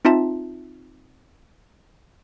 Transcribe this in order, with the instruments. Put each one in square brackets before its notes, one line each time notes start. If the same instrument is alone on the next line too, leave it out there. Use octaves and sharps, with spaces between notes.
[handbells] C4 D#4 F4 E5 A5